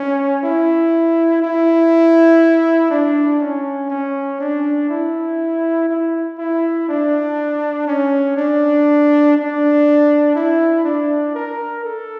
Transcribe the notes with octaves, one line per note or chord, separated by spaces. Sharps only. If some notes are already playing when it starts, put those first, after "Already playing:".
Already playing: C#4
E4
E4
D4
C#4
C#4
D4
E4
E4
E4
D4
C#4
D4
D4
E4
D4
A#4
A4